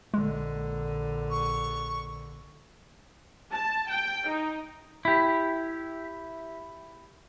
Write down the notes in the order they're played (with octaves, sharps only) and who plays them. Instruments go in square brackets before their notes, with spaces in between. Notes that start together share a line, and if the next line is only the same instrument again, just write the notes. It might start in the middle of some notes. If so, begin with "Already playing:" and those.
[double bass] A#1 D3 [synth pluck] G#3
[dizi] C#6
[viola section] A5
G5
D#4
[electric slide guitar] E4 G4